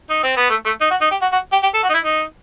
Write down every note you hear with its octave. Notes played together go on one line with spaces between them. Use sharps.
D#4
C4
B3
A3
A3
D#4
F#4
D#4
G4
F#4
F#4
G4
G4
A4
F#4
D#4
E4
D#4